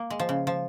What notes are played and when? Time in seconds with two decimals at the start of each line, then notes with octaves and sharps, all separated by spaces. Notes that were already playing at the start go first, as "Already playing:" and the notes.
Already playing: A#3
0.10 G#3
0.20 F3
0.29 C#3
0.47 F3